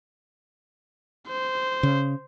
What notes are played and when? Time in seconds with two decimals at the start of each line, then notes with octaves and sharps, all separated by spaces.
1.28 C5
1.83 C#3